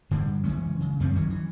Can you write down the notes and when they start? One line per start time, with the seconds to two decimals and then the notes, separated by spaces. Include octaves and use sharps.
0.11 G2 D3 G3 G#3
0.44 F#1 E3 G#3 C#4
0.80 C#3
1.00 F#2 G3 C4 C#4
1.15 D#3 E3 F#3 C#4
1.30 E3